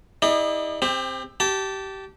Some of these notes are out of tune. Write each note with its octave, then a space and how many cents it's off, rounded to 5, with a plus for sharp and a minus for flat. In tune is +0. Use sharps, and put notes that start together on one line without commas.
E4 -40 G#4 -45 D5 +45
C4 +0 G4 +30
G4 -20 A5 +0